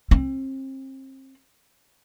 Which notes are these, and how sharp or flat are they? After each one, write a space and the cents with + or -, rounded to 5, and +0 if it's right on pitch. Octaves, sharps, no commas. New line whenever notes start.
C4 +35